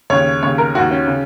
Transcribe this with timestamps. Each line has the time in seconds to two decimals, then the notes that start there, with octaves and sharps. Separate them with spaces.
0.10 D#2 C#3 C#5
0.43 D#2 C#3 C#5
0.58 A#4
0.75 D#3 F#4
0.78 D#2
0.91 C#4
1.07 C#3